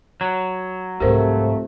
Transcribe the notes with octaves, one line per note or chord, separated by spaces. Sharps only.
F#3
C2 G#2 C3 F3 A3 G4 A#4 C5